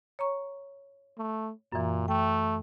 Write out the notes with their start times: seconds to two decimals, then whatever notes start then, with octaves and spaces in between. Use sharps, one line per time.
0.19 C#5 A#5 C#6
1.18 A3
1.72 F#2 A#2 E3
2.08 A3 G5